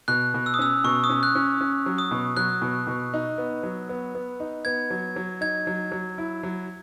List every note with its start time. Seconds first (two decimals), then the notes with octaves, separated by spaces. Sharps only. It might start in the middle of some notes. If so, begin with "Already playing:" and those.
0.08 B2 F#6
0.34 B2
0.46 E6
0.54 D#6
0.59 C#4 E6
0.84 B2 C#6
1.04 D#6
1.09 C#4
1.23 F#6
1.35 C#4
1.61 C#4
1.86 F#3
1.98 D#6
2.11 B2
2.37 F#3 F#6
2.62 B2
2.87 B2
3.14 D#4
3.38 B3
3.63 F#3
3.89 B3
4.15 B3
4.40 D#4
4.65 B3 G#6
4.90 F#3
5.16 F#3
5.41 D#4 G#6
5.67 F#3
5.92 F#3
6.18 E4
6.43 F#3